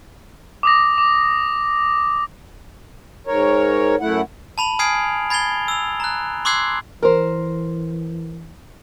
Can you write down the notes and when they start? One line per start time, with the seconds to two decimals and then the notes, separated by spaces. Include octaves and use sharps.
0.63 D6 D#6 A#6
0.98 D6
3.27 G#2 A#4 C#5
4.01 F#2 A3 E4 F#5
4.58 A5 B5 F7 F#7
4.79 G#5 D#6 F6 G#6 C7 D7
5.30 B5 G#6 A6 C7 F7 G7
5.68 E6 F7
6.00 A#5 F#6
6.45 C6 D6 E6 F#6 G#6 C7
7.03 E3 A#4 C5